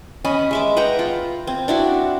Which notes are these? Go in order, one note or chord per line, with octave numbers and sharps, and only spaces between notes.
C#4 D#5 B5
G#3 E5 D6
B4 F#5 G5 A#5
F4
C4
D4 E4 F#4